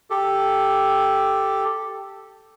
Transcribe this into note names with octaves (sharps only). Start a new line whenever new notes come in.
G4 A4